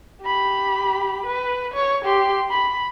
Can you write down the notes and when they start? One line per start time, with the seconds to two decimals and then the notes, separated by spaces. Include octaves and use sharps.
0.22 G4 B5
1.26 B4
1.74 C#5
2.05 G4 C6
2.51 B5